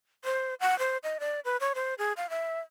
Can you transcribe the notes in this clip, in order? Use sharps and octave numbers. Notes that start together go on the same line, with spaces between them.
C5
F#5
C5
D#5
D5
B4
C#5
C5
G#4
F5
E5